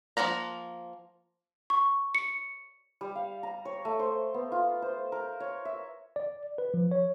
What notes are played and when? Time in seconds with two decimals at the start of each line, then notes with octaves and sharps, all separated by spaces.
0.17 F3 G#3 A#3 F#5 A#5
1.70 C#6
2.15 C#7
3.01 G3
3.15 F5
3.43 A#5
3.65 C#5
3.85 A3
3.99 C5
4.34 B3
4.52 F4
4.82 C5
5.12 A#4
5.40 C#5
5.65 E5
6.16 D5
6.58 B4
6.74 F3
6.91 C#5